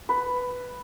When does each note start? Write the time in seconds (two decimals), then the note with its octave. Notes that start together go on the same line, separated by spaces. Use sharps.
0.09 B4